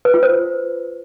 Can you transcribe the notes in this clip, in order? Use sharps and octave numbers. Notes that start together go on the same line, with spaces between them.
B4
F4
C5